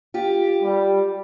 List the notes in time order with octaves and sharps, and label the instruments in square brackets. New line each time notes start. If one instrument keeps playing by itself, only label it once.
[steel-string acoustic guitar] F4 G4
[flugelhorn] G3